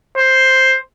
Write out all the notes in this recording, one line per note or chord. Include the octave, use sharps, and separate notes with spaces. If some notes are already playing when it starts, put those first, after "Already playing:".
C5